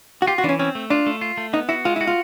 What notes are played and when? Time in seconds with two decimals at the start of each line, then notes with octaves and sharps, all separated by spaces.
0.22 F#4
0.27 F4 G4
0.38 F#4
0.44 E3 D4
0.49 C#4
0.59 C4 C#4
0.75 A3
0.90 D4 F4
1.07 A3
1.21 F4
1.37 A3
1.53 B3 D#4
1.69 E4 F#4
1.85 G#3 F4
1.96 E4 F#4
2.07 F4